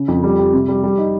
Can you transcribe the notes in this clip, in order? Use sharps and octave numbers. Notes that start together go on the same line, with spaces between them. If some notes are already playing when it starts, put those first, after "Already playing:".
Already playing: C#3
F2
G3
G4
C3
G3
G3
D#4